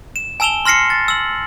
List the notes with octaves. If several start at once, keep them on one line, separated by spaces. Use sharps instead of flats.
E7
G#5 A5 E6 E7 F7 G7
C6 F6 A#6 C7 C#7
A6
E6 F#7